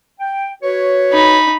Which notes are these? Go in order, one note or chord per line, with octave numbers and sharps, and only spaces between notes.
G5
F#4 B4 C#5
D#4 B5